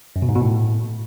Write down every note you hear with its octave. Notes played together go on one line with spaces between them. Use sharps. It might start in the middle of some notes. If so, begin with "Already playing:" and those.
F#2
B2
G#2
B2
A2